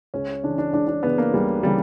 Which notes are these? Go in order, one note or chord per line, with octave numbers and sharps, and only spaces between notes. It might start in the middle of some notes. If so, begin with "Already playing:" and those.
C#2 C#4
C#3 E3 D4
D4
C#2 D4
D4
C#3 E3 B3
A#3
C#2 G3
C#3 E3 G3